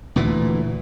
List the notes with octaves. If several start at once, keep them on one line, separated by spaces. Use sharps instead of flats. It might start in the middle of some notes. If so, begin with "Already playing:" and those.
D2 A#2 E3